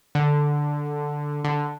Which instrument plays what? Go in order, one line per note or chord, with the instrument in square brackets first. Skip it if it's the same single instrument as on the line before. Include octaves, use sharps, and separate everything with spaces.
[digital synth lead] D3
D3